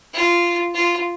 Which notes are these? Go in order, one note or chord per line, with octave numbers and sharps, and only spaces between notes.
F4
F4